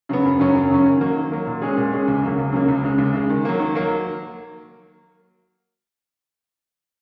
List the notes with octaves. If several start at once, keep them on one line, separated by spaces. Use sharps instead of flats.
C#3 F#3 B3
F#2
C#3 F#3 C#4
F#2
C#3 F#3 C#4
D#3
F#3 A#3
D#3
F#3 A#3
A#2
G#3 C#4 G#4
A#2
G#3 C#4 G#4
C#2
C#3 F#3 A#3
C#2
C#3 F#3 A#3
C#2
C#3 G#3
C#2
C#3 G#3
D#3
F#3 A#3
D#3
F#3 A#3